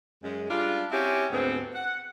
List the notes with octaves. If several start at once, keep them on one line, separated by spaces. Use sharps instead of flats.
F#2 G#3
G3 G#3 D4 F4
C4 C#4 E4 F#4 G4
D2 G#2 B3 C4
F#5